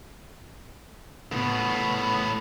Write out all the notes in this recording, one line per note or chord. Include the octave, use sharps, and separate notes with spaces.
A2 B3